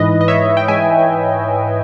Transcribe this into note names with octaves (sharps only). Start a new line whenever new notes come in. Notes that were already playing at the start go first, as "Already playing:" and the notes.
Already playing: G#2 E3 B4 D#5
D#5
C#5 E5
G5
G#2 E3 E5 G#5